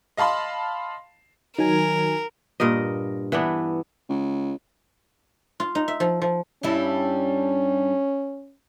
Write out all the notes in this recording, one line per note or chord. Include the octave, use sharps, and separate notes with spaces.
D#5 F5 A5 B5 C6
D#3 F#3 A#4 G#5
G2 A#2 A#4 D#5
E3 B3 D4
C#2
F4
D#4
E5
F3
F3
G2 G3 C#4 E4